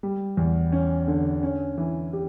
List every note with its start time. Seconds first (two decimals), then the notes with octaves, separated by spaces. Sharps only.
0.03 G3
0.37 E2
0.72 C#4
1.08 D3
1.43 C#4
1.78 E3
2.13 G4